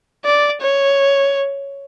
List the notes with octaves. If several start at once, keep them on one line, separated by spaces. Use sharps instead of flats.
D5
C#5